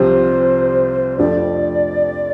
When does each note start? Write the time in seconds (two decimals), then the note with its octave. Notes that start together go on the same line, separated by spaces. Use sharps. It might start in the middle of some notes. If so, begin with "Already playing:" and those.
Already playing: C2 C3 F3 C5
1.18 F2 F3 A3 D4 D5